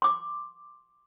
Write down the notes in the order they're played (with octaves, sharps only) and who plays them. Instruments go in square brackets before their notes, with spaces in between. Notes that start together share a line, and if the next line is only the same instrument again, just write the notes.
[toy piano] C6 D6